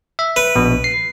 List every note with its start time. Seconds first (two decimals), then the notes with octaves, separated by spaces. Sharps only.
0.19 E5
0.36 B4
0.56 A#1 B2
0.84 C7